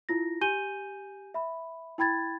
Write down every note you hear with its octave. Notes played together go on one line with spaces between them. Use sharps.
E4 F4 A#6
G4 G#5 G6 D#7 G7
E5 B5
E4 G5 B5 G#6 A6